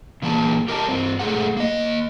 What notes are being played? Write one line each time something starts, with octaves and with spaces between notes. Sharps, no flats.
A#2 E3 A#3 G#4 A5
G4 A#4 D#5 E5 G5 A5
G2 C4
G#2 B2 A3 G#4 F#5
A#3 D#5